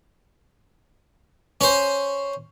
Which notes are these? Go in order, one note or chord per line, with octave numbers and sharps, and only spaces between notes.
C#4 C5